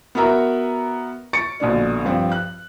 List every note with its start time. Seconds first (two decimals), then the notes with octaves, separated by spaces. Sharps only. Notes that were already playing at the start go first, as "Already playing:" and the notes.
0.15 B3 F#4 A#4 E5 A#5
1.33 C#6 A6 C#7 D7
1.60 A#1 B2 D3 D5
2.05 G2 F3 C4
2.32 F#6